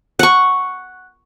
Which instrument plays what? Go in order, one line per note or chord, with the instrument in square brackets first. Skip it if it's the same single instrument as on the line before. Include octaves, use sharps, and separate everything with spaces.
[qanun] F#5 C#6